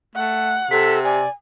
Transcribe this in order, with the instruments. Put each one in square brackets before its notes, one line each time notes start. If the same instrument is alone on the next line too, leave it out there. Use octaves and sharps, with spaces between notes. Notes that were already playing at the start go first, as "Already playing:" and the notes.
[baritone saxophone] A3 [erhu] F#5
[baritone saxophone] C3 [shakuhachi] A4 [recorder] B6
[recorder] D5 [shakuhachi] G#5